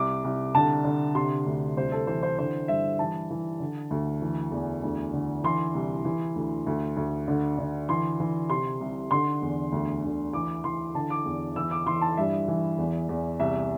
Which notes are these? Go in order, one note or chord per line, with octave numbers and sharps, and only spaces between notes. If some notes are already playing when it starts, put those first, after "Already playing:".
Already playing: C2 D6
C2
D3 A5
D3
C3 C6
D2
C2 C5
A4
E3 C5
C5
D3 C5
G2 E5
E3 A5
E3
D3
D2
E3
E2
D2
D3
E3 C6
C2
E3
D2
D2
D2
D3
D3
E3 C6
E3
C3 C6
C2
D3 C6
E2
D2
D2
E3 D6
E3 C6
D3 A5
D6
E2
E3 E6
D6
E3 C6
A5
G2 E5
E3
E2
E2
C2 E5